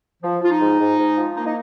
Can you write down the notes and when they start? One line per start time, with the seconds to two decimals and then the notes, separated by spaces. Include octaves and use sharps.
0.23 F3
0.41 F3 F4
0.51 D#4
0.60 G#2
0.79 G#2
0.98 G#2
1.16 F3
1.36 A#3 D#4
1.47 D#4